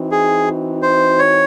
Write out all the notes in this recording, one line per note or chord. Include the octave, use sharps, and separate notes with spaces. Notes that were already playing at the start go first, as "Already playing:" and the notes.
Already playing: E3 C4 D#4 F#4
G#4
C5
C#5